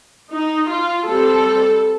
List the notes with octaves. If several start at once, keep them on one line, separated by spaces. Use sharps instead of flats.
D#4
F4
G3 C4 A4